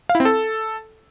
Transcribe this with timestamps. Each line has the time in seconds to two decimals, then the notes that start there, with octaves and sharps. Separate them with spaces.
0.09 F5
0.15 E4
0.20 C4
0.25 A4